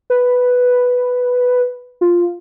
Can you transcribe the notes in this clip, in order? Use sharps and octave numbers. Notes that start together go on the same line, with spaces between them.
B4
F4